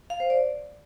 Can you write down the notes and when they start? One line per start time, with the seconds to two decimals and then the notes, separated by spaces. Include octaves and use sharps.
0.10 F5
0.20 C5
0.30 D5